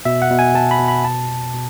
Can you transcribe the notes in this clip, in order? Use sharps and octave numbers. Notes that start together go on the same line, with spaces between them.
B2 E5
F#5
B2
G#5
B2 A5
B5
B2
B5
B2 A5
B2
B2